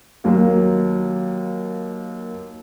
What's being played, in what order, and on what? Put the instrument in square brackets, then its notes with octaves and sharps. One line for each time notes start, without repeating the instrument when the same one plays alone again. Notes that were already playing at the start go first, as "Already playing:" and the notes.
[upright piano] D#2 F#3 A#3